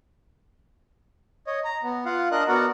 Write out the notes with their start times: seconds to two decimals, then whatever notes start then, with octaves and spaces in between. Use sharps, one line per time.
1.47 C#5 D#5
1.65 A#5
1.83 B3
2.05 F4 F5 F#5
2.31 D4 A#4 D#5 F#6
2.48 B3 F#4 A#4 D5 F#5